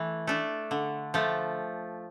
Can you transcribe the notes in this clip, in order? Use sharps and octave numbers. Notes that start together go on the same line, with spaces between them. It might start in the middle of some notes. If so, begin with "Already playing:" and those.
Already playing: E3 A3
A3 D4
D3
F3 A3